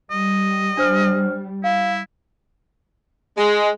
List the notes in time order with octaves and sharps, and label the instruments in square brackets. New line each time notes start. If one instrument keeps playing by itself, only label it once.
[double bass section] G3 [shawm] D#5
[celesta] D4 C5 F6
[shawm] E4 [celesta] F5
[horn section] G#3